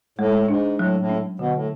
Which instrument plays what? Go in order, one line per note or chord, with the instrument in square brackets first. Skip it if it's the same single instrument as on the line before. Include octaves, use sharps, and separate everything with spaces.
[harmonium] A2 [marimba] G#3
[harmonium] G#2 [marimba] D4
[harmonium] A2 [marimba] F#3
[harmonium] A2
[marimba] C#4
[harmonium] B2 [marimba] D3
[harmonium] A2